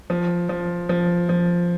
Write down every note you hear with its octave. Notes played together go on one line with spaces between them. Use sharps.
F3
F3
F3
F3